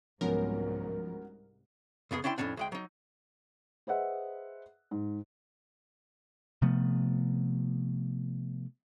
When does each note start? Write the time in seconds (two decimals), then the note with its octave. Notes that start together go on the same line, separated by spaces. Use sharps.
0.21 C2 G#2 F3 F#3 B3 C#4 A#4
2.11 C#2 F#2 B3 G#4
2.24 C#4 D4 E4 G5 C6
2.38 F2 A2 C3 C#4 D4
2.57 D2 G#3 G5
2.72 F#3 D#4
3.87 G#4 B4 C5 D#5 E5 F#5
4.91 G#2
6.62 C3 F3 A3 B3